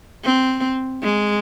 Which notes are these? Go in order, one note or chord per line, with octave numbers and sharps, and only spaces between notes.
C4
G#3